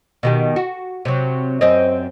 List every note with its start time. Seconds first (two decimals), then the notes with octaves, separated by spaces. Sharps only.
0.23 B2 D#3 G4
0.56 F#4
1.05 C3 F#3
1.61 F#2 C4 D#5